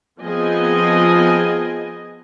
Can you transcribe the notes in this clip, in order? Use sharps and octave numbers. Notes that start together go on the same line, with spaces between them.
F3 B3 C4 G#4 D#5 G#5